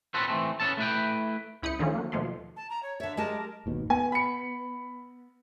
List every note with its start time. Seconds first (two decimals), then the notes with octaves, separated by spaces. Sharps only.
0.14 C4 F4 F#4 A4 B4
0.28 E3 A3 C4
0.60 B3 C#4 A4 A5
0.77 A3 E4 B4 G5
1.62 C#2 E4 B5 D#6 G6 C#7
1.79 D3 D#3 F3 A3 C#4 F4
1.95 F#3 A#3
2.12 D#2 B2 F3 A3 C6
2.56 A5
2.69 A#5
2.83 C#5
3.00 D3 C#5 E5
3.17 G#3 G4 A#4 A5
3.66 G#1 D#2 B2
3.90 B3 G#5
4.12 B5 C#7